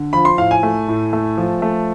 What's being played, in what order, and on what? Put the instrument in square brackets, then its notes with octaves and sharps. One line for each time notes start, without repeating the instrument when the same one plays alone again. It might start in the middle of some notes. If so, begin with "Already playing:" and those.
Already playing: [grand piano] D3
F3 B5
C6
A2 F5
G#5
A3
A2
A3
F3
A3